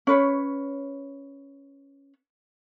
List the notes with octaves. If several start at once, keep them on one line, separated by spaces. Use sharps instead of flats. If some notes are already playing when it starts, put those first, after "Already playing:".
C#4 B4 C#5